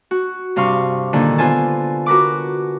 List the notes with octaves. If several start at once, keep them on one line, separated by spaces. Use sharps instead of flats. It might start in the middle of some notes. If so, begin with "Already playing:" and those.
F#4
G2 C3 F5 C6 C#6
A#2 D3 D#3
B3 F4 C5 G#5 A5
F#4 A#4 B4 D6